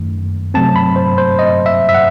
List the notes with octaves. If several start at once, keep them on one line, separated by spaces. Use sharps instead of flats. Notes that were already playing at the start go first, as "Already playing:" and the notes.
Already playing: F#2 D#3 A3
C3 F#3 A3 C4 A5
B5
C5
C5
D#5
E5
E5
F#5